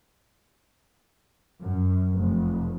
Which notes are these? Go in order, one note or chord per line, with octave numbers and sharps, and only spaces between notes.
F#2
F1